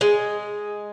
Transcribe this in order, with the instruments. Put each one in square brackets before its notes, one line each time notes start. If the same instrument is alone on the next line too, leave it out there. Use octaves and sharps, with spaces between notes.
[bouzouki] G#3